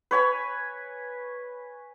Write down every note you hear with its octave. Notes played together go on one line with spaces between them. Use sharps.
B4 C#5 G#5 B5